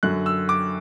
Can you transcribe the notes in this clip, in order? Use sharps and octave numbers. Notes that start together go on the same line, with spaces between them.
F#2 D3 F#6
E6
D6